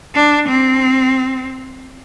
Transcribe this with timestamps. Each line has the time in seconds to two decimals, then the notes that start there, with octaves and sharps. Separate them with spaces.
0.15 D4
0.49 C4